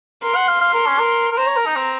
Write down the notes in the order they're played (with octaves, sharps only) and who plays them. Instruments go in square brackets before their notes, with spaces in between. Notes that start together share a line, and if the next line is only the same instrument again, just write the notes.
[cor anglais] A#4 [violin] C6
[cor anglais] F#5
F5
F5
A#4
C#4
A#4
A#4
[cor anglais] C5 [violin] A#5
[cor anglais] C#5
A#4
D#4
C4